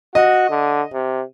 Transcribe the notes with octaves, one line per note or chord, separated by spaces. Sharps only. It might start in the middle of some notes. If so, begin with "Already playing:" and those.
F#4 D#5
D3
C3